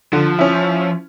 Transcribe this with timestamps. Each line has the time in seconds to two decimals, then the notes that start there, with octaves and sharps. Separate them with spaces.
0.13 D3 F3
0.39 C#4 E4